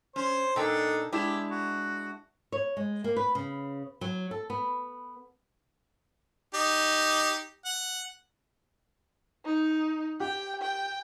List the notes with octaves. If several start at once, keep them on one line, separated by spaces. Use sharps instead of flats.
C#4 C5
A#2 D4 D#4 A4 G5
G#3 D4 E4 G4
F#4
C#5
G#3
A#3
B4
C#3
F#3
A4
B3
D#4 G4
F#5
D#4
G4 G5
G5